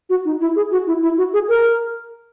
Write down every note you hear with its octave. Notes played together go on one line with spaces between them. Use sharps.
F#4
D#4
E4
G#4
F#4
E4
E4
F#4
G#4
A#4